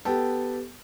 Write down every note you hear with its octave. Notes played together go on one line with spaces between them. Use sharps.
B3 G4 A4